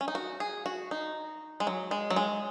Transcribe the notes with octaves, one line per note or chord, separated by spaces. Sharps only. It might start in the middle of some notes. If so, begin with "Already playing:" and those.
C#4
D#4
F#4
G#4
F#4
D#4
G#3
F#3
G#3
F#3
G#3